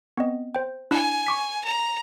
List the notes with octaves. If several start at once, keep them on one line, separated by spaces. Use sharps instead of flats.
B3 C4 D#5
C5 G5
D4 E4 G#5 F#6
C#6 D6 B6
A#5